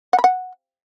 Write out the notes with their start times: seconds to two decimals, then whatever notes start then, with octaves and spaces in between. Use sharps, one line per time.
0.13 F#5
0.19 B5
0.24 F#5